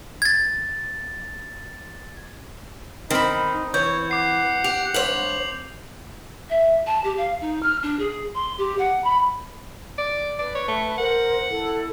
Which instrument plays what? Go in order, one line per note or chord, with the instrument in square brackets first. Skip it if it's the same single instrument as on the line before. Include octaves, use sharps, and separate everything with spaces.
[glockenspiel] G#6 A6
[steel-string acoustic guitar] D#3 [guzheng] C4 B5 [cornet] D#4
[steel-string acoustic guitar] E3 [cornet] C#5 [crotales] G6
[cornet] F#5 [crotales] D6 C7
[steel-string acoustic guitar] G4 [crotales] F7
[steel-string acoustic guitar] G2 C5 C#5 [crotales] F#7
[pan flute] E5
A5
G4
F5
D#4
F6
D4
G#4
C6
G4
F#5
B5
[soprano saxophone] D5
[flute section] B4 [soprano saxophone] D5
[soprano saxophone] C#5
A3
[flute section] A#4 C5 [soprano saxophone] F#5
[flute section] E4 A4